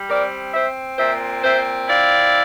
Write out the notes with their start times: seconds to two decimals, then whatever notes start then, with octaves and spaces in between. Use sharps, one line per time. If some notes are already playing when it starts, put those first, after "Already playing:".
Already playing: G3
0.10 C4 A#4 D5
0.54 C4 C5 E5
0.99 A#2 C5 E5
1.44 C4 C5 E5
1.88 E4 D5 F5